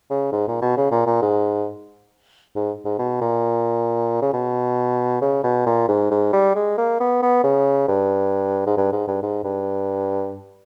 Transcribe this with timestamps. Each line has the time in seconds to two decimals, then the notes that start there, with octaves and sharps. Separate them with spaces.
0.10 C#3
0.32 G#2
0.48 A#2
0.62 B2
0.77 C#3
0.91 A#2
1.07 A#2
1.22 G#2
2.55 G#2
2.85 G#2
2.99 B2
3.21 A#2
4.22 C#3
4.33 B2
5.21 C#3
5.44 B2
5.66 A#2
5.88 G#2
6.11 G#2
6.33 G3
6.56 G#3
6.78 A#3
7.00 B3
7.22 B3
7.44 C#3
7.89 G2
8.67 G#2
8.77 G2
8.92 G#2
9.08 G2
9.23 G#2
9.44 G2